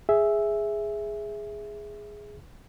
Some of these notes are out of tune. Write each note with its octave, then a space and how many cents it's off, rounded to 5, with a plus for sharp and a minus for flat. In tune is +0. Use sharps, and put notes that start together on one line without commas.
G#4 +0 E5 +0